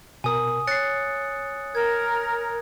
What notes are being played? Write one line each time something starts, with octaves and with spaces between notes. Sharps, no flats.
B2 A#4 G#5 D#6
C#5 F#6 A6 C7 C#7
A#4 G#6